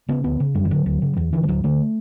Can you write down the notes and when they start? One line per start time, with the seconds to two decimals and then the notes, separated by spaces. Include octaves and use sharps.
0.09 C#3 B3
0.24 D2 B3
0.40 C#3
0.55 F#2 G3
0.65 E3
0.71 D3 F#3
0.86 D2
1.02 C#3
1.16 E2 E3
1.33 D3 E3
1.43 G3
1.48 D2 F#3
1.64 D3 A3